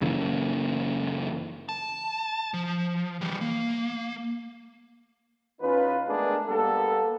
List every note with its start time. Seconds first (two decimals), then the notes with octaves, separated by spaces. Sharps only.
0.01 F#1 C#3 E3 A#3
1.69 A5
2.54 F3
3.21 E3 G3
3.41 A#3
5.61 E2 C#4 D#4 F4 B4
6.08 G#3 A3 B3 D4 G#4 A#4
6.48 G3 A#3 B3 A4